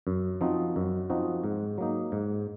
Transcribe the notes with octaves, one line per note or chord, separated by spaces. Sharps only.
F#2
F3 C4 D#4 F#4
F#2
F3 C4 D#4 F#4
G#2
F#3 A#3 D#4
G#2